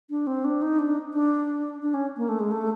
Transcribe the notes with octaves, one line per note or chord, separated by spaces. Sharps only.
D4
C4
D4
D#4
D4
D4
D4
C#4
A#3
A3
G#3
A3